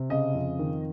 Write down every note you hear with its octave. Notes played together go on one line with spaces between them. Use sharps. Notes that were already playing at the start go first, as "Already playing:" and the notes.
Already playing: C3
C#3 D#5
F2
D#3